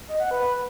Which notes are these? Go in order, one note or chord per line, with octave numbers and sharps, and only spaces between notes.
D#5
F#5
B4